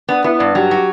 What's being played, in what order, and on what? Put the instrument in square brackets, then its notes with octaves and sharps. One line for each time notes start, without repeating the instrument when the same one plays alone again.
[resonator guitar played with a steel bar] B3 [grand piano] D4
[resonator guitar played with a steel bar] B3 [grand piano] E4
[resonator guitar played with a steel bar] G2 [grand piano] D5
[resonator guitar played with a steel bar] F#3 [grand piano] G4
[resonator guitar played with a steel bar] F#4 [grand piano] G4